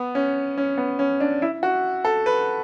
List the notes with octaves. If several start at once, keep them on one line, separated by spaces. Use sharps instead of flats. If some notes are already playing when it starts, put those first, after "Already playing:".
Already playing: B3
C#4
C#4
B3
C#4
D4
E4
F#4
A4
B4